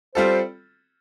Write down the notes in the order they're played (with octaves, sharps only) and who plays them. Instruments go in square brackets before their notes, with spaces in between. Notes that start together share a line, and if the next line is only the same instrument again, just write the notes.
[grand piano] G3 C4 F4 A4 [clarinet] C5